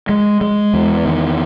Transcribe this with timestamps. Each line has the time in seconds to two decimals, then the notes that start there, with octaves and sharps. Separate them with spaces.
0.09 G#3
0.41 G#3
0.73 E2
1.05 D#3